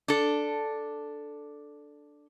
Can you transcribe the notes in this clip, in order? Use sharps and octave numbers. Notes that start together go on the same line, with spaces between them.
D4 A4